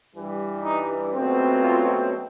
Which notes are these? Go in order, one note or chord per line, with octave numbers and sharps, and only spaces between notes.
G2 E3 G3
D#4
C#2 B2 F#3 A3 C4
F4